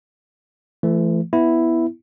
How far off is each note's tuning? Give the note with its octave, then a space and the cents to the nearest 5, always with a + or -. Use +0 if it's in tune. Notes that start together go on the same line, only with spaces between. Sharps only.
E3 +40 A3 +0
B3 +0 E4 +0